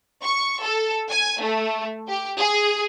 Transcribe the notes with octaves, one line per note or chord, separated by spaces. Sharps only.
C#6
A4
G#5
A3
G4
G#4